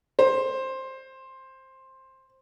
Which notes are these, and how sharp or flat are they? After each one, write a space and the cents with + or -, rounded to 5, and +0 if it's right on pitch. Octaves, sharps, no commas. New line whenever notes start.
C5 +10